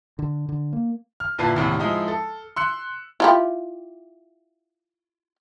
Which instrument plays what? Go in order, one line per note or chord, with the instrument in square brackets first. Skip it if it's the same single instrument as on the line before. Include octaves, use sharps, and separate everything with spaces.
[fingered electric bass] D3
D3
A#3
[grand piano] F6
G1 A#2 E4 B4 A5 C7
E1 D#2 A2 C3
F3 G#3 D#4 E4
A4
C6 E6 F#6 C#7
[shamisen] E4 F4 G4